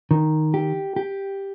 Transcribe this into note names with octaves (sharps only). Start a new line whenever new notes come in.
D#3
G4
G4